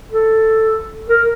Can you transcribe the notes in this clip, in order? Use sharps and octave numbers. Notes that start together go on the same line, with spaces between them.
A4
A#4